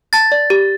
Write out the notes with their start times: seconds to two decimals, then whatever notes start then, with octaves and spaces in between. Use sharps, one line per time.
0.13 A5 A6
0.32 D5
0.50 G4